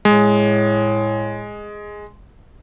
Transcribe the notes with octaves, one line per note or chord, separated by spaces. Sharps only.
A2 G#3